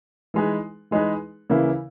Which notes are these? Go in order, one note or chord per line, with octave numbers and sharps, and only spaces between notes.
E3 G#3 D#4 G#4 B4
E3 G#3 D#4 G#4 B4
C#3 E3 A#3 E4